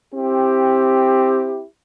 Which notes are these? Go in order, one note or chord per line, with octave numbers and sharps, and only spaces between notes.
C4 E4 G4